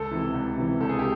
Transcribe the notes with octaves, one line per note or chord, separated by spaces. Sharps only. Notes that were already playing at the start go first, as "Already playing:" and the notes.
Already playing: C#2 A4
C3 E3
C#2
C3 E3
C#2 A4
G#4
G4